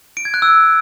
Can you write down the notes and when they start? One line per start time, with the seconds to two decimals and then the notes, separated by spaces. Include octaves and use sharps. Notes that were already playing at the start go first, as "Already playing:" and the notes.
0.17 D7
0.25 G#6
0.34 F#6
0.42 E6